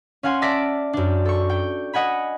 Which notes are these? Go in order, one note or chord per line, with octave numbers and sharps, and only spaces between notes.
C#4 F5 F#5 G#5 C6
D5 E5 A5 A#6 B6 D7
F#2 D4
A4 C#6
G5
D#5 F#5 G#5 B5